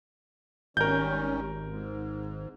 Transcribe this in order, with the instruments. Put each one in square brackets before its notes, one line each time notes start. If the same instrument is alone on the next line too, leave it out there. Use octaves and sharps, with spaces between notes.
[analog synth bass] G#1 [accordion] D#3 G3 C#4 [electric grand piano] A#4 G6
[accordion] G#2